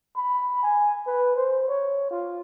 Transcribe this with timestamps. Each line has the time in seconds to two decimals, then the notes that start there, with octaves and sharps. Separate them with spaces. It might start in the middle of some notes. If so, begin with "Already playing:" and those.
0.16 B5
0.63 G#5
1.07 B4
1.36 C5
1.68 C#5
2.11 F4